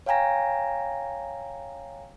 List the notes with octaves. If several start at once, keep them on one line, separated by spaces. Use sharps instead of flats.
C#5 F5 G5 G#5 A#5 A#6